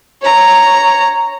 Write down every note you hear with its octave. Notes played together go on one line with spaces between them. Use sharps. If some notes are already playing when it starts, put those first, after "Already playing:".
C#5 A#5